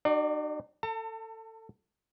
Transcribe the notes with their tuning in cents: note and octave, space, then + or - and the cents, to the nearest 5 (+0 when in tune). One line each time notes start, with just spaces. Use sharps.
D#4 -45 F#4 +40 D5 +10
A4 +20 A5 +45